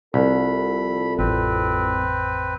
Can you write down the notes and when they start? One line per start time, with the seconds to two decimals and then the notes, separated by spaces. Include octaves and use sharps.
0.14 C2 F3 E4 A4 B5
1.18 A1 F2 C4 B4